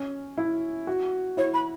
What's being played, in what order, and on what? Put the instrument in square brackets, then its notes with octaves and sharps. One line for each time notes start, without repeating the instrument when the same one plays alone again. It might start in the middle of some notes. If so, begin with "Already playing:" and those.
Already playing: [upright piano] C#4
E4
F#4
[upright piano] E4 [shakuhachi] C#5
[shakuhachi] B5